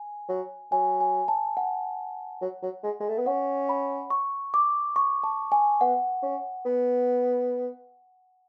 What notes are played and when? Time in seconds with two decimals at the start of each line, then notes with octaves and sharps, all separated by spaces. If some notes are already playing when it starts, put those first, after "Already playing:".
Already playing: G#5
0.29 F#3
0.72 F#3 G#5
1.01 G#5
1.28 A5
1.57 F#5
2.42 F#3
2.63 F#3
2.83 G#3
3.00 G#3
3.09 A3
3.18 B3
3.26 C#4 F#5
3.69 B5
4.10 C#6
4.54 D6
4.96 C#6
5.23 A5
5.52 G#5
5.81 B3 F#5
6.23 C#4
6.66 B3